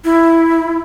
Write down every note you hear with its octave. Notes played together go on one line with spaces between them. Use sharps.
E4